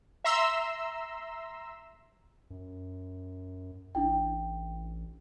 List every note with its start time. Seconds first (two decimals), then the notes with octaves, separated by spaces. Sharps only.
0.24 E5 A#5 C6 E6
2.50 F#2
3.95 A1 D4 E4 G5